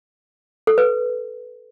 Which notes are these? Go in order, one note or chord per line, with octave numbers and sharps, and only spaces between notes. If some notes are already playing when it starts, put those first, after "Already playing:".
A4
B4